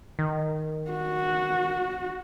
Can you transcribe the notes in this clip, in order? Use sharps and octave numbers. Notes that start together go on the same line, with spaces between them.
D#3
F#4